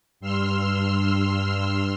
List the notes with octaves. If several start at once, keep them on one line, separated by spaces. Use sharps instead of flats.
G2 C6 E6 F6